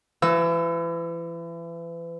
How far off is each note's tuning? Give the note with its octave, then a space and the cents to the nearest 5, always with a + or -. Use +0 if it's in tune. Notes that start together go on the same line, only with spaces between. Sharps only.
E3 +35 E6 +0